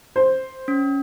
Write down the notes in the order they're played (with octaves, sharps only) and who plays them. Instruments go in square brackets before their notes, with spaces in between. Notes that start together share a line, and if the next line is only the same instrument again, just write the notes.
[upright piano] C5
[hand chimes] C#4